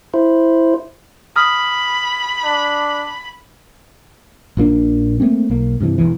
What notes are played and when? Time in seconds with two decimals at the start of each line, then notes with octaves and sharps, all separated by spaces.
0.14 E4 C5
1.36 B5 D#6 F6
2.43 D4
4.57 A#1 A#2 A#3 D4
5.20 A3 A#3 C4 C#4
5.50 B1 A#3
5.80 G2 C3 E3
5.98 E1 E2 E3